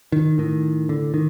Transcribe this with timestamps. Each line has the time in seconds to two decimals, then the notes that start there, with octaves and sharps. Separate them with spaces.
0.12 D#3
0.38 A2 D#3
0.89 D3
1.14 D#3